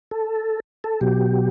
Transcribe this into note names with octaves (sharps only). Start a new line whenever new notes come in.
A4
A4
B2 F#3 G4